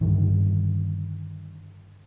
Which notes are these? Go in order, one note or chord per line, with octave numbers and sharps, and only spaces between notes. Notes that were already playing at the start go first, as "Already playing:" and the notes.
G2 D3 D#3